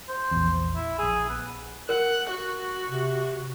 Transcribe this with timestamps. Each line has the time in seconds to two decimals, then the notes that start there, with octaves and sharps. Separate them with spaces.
0.09 C5
0.31 A#1 E2
0.76 E4
0.99 A#1 G#4 E6
1.29 B3
1.89 A#4 F#5
2.30 F#4
2.89 C3